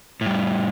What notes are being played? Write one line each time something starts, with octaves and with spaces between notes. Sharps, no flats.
A2
G3